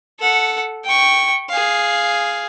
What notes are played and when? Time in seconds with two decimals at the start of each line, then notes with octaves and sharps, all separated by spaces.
0.20 A4 F#5
0.84 G5 C#6
1.49 G#4 F5